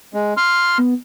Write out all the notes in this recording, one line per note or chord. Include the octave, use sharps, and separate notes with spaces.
G#3
C6 F6
B3